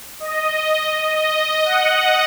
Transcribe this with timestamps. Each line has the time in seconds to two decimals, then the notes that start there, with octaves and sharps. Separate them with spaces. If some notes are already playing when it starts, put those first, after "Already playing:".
0.20 D#5
1.15 D#5
1.65 F#5